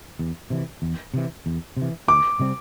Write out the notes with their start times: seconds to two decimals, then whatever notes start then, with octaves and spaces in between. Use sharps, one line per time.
0.19 E2
0.50 C3 E3
0.82 E2
1.14 C3 E3
1.46 E2
1.77 C3
1.82 E3
2.08 D2 D6
2.40 C3 G3 C4